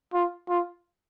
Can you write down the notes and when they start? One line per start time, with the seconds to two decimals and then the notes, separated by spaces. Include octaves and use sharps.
0.13 F4
0.49 F4